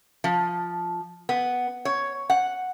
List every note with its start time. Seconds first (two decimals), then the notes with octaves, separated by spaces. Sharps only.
0.24 F3
1.29 B3
1.85 C#5
2.30 F#5